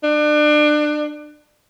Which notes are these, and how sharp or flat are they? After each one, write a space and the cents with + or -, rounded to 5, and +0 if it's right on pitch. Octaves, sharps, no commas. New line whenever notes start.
D4 +30